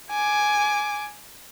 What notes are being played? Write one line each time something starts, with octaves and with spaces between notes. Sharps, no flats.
G#5 D6